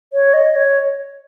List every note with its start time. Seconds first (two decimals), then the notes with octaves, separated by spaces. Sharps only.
0.13 C#5
0.34 D#5
0.56 C#5